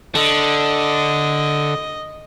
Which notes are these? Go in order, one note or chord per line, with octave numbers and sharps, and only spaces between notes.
D3 D#5